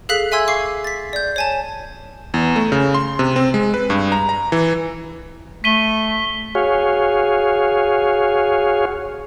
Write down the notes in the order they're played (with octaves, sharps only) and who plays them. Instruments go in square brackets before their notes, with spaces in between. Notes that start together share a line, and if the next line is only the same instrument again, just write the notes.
[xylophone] G#4 A4 F5 F#6 B6 F#7
E5 G#5 C6 E6 G#6
F5 C#6 D6 C7
A6 B6
D5 G6
C#5 G#5 A5
[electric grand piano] E2
A3
C#3
C6
C3
C4
G#3
B4
G2
A#5
A#5
E3
[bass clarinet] A3 [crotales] B6 D#7 G7
[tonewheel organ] F#4 G#4 C#5 F5